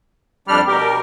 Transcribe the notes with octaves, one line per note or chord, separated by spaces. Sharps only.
F2 G3 D4 F6
B2 G4 A#4